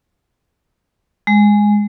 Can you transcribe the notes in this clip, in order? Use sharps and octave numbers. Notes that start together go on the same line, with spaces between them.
G#3